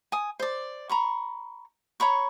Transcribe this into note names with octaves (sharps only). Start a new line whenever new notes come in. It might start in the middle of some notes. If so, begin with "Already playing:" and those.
G#5 D#6
C5 D5
A#5 B5 C#6
C#5 A#5 B5 C#6